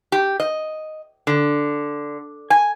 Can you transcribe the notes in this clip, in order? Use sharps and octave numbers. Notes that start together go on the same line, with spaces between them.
G4
D#5
D3
G#5